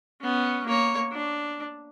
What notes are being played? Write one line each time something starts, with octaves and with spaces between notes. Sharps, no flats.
B3 C#4
A#3 C#5
D4